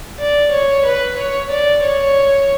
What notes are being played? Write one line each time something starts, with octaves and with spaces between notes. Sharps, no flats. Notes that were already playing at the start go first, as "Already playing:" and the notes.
D5
C#5
B4
C#5
D5
C#5